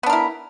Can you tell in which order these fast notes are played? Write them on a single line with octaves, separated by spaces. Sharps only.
B3 D4 A#4 E4